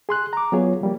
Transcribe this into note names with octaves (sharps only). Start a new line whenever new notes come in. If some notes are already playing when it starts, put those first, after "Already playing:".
G#4 C6 F#6
A#5 D6
F#3 B3 F4 G#4 C#5
F3 G3 A#3